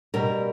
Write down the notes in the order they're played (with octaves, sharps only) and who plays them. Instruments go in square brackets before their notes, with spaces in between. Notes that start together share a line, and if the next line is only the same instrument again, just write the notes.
[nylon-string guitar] B2 G3 A#4